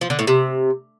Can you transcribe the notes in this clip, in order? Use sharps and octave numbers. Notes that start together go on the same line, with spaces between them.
F3
D3
A2
C3